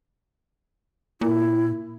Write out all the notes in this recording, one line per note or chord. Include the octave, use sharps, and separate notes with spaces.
A#2 E4